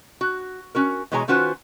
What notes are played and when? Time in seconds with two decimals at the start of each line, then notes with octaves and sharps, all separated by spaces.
0.21 F#4
0.75 C#4 F#4 A#4
1.12 B2 E3 G#3 C#5 G#5 A#5
1.28 D#3 C#4 F4 F#4 B4 C5